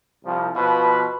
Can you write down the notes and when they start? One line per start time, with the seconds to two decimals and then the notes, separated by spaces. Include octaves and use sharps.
0.24 C2 F3
0.56 B2 F3 F4 B4